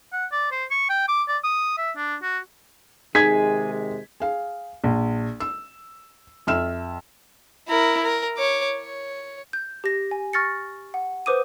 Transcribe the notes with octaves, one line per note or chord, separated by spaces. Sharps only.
F#5
D5
C5
C#6
G5
D6
D5
D#6
E5
D4
F#4
C3 D#3 G#3 D#4 G#4 G#6 B6
G#4 F5
A#1
E6
F2 E5 E6 F6 E7
E4 A#4
A#4
C#5 D6
C#5
G6
G4 A#6
G#5
C#6 F6 A6 A#6 C#7
F#5
B4 C5 D6 D#6 D#7